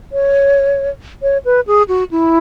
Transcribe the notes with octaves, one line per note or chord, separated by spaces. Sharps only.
C#5
C#5
B4
G#4
F#4
E4